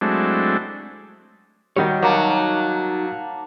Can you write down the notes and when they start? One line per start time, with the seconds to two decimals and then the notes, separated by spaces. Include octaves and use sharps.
0.01 F#3 G#3 A3 C4 D4 E4
1.77 D#3 G3 D#4 F#4 C#5
2.02 F#3 A#3 A5